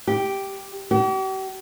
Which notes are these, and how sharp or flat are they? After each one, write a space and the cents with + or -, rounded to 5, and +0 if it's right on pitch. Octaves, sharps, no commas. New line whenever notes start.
G4 -5
G4 -45